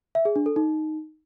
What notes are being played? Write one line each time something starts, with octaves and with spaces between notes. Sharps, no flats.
E5
G#4
D4
A4
D#4